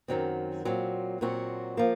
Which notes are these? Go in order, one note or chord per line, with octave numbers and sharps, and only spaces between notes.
F#2 D#3 F#3 C4
A#2 F#3 C4
A#2 F#3 C4 F#4
F3 A#3